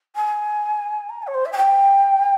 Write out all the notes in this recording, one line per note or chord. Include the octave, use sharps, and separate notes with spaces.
G#5
A#5
G#5
C#5
C5
E5
G#5
G5